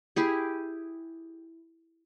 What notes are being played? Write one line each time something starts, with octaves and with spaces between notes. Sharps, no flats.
E4 G4 G#4